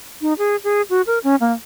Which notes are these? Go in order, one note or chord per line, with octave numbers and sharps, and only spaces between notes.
D#4
G#4
G#4
F#4
A#4
C#4
A#3